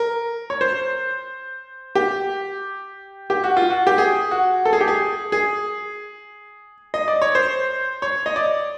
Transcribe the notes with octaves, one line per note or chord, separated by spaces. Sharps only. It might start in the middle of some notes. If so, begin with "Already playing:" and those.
Already playing: A#4
C#5
C5
G4
G4
F#4
F4
F#4
G4
G#4
F#4
A4
G#4
G4
G#4
G#4
D#5
D5
C#5
C5
C#5
D#5
D5